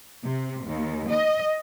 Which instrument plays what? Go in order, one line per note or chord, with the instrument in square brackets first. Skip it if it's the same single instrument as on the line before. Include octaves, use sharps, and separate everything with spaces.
[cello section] C3
D#2
D#5